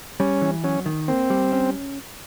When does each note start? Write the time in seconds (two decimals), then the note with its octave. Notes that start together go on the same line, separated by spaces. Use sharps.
0.20 G3 C#4
0.42 E3
0.64 F#3 C#4
0.86 D#3
1.08 A#3 C4
1.30 G3
1.52 C#4